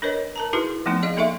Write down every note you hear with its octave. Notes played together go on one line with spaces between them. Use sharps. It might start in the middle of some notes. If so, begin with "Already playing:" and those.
D4 A#4 B4 C#5 D#5
A#4 A5 A#5
D#4 E4 F#4 G#4 A4 B4
F3 A3 B3 C4 D#4
G#4 D5 D#5 F5
A#3 D#4 A4 E5 F5 C#6